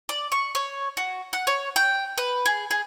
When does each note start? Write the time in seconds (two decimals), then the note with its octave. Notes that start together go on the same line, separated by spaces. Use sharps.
0.09 D5
0.32 C#6
0.55 C#5
0.97 F#4
1.33 F#5
1.47 C#5
1.76 G5
2.18 B4
2.46 G#4
2.71 G#4